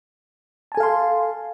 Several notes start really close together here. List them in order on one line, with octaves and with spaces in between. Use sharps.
A5 G#5 A4 F5 C6